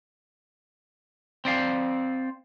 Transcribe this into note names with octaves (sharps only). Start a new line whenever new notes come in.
C4 D5 F5